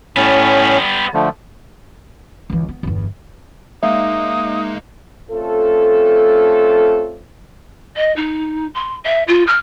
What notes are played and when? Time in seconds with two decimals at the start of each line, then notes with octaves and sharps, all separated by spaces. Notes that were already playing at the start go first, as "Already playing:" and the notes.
0.16 A2 G3 B3 C#4
1.14 D3 F3 A3
2.50 C#2 E3
2.69 B3
2.83 G1 E2
3.83 G#3 A#3 D#4 E5 F5 D#6
5.31 A3 C4 C#4 F4 A4
7.96 D#5
8.16 D#4
8.74 C6
9.05 E5
9.27 F4
9.47 F6